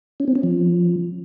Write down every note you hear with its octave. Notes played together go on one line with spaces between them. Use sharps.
C#4
C4
C#4
F3